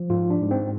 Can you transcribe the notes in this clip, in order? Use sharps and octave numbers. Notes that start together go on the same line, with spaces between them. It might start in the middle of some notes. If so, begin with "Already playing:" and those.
Already playing: F3
G#2 F4
D4
G#2
C4